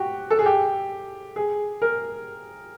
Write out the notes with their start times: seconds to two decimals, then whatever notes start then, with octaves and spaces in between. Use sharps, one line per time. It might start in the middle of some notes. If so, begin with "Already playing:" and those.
Already playing: F#4 G4
0.30 A4
0.39 G#4
0.46 G4
1.36 G#4
1.82 A#4